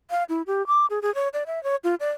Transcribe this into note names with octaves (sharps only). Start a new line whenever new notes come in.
F5
E4
G4
D6
G#4
G#4
C#5
D5
E5
C#5
F4
D5